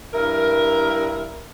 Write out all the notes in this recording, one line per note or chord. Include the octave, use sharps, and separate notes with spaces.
G2 E4 A#4